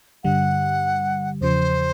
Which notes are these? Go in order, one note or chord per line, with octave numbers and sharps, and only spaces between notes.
G2 D3 G3 F#5
E2 C#3 F3 C5